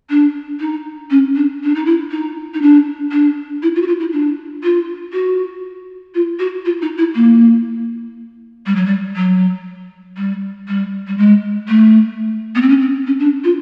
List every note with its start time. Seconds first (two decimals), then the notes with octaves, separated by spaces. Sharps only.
0.10 D4
0.60 D#4
1.10 C#4
1.36 D4
1.63 D4
1.75 D#4
1.86 E4
2.11 D#4
2.54 D#4
2.62 D4
3.12 D4
3.62 E4
3.76 F4
3.82 F#4
3.87 F4
4.00 E4
4.12 D4
4.63 F4
5.13 F#4
6.15 F4
6.39 F#4
6.65 F4
6.82 D#4
6.98 E4
7.15 A#3
8.66 G3
8.76 F#3
8.86 G3
9.16 F#3
10.17 G3
10.68 G3
11.07 G3
11.18 G#3
11.68 A3
12.55 B3
12.62 C4
12.69 C#4
12.81 C4
13.07 C#4
13.20 D4
13.44 F4